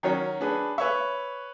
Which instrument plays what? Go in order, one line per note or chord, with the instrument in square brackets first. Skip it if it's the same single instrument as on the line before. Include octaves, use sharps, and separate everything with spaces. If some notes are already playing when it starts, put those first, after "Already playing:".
[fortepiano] D#3 F#3 C#4
[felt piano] D4 G#4 B4
[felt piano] B4 C#5 C#6 [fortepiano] E5